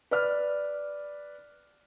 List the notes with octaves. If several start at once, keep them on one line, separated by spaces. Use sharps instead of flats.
B4 D5 F6